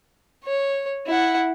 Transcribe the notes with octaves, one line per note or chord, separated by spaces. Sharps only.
C#5
E4 F#5